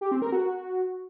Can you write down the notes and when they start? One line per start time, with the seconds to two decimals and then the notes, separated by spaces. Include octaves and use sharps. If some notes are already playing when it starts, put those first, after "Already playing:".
0.01 G4
0.11 C4
0.22 A#4
0.32 F#4